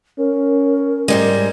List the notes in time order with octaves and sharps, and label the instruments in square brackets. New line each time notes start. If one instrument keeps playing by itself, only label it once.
[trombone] C#4 [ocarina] A#4
[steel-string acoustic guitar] G#2 G3 G#3